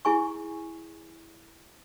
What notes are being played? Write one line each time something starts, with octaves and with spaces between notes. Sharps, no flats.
E4 G#4 G#5 C#6